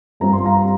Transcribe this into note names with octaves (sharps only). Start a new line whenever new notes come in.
G2 G3 C4 F4 A#5
C6
F5 A#5